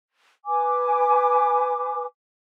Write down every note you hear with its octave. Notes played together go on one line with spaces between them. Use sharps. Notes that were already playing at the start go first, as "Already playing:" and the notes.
B4 G#5 D6